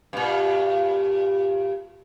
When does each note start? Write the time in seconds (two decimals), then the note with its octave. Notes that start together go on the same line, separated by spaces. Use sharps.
0.13 G2 A#2